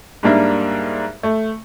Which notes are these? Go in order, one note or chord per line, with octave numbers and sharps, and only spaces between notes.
G#2 G3 A#3 D4 E5 A#5
A3